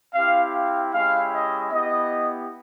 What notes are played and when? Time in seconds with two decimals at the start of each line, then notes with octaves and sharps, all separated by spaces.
0.14 C4 E4 G4 F5
0.54 F5
0.93 G#3 C#4 E4 G4 F5
1.32 D#5
1.72 B3 E4 G4 D#5